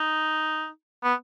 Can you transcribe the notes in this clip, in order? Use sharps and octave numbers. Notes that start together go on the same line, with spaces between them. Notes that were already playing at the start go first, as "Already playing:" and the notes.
Already playing: D#4
B3